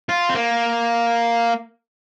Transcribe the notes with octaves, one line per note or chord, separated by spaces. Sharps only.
F4
C4
A#3